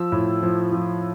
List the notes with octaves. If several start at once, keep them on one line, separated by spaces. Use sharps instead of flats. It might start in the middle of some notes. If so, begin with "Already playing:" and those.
Already playing: F3 E6
A2
F3
F3